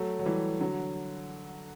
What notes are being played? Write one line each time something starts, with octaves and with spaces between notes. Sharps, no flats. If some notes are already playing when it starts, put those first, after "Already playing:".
Already playing: F#3 A3
F#3
E3 G3
D3 F#3